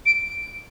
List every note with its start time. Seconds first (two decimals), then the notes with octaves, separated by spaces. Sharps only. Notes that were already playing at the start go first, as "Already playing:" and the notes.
0.06 D7